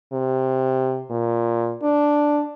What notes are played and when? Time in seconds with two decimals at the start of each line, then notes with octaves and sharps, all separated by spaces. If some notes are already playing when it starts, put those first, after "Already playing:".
0.13 C3
1.10 A#2
1.83 D4